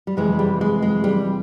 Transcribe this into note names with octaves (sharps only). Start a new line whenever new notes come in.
G3
F2 C3 E3 G#3
G3
G#3
G#3
G3